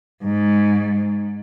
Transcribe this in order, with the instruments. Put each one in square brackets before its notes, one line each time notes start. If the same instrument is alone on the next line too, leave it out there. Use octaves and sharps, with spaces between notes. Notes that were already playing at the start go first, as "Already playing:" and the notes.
[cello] G#2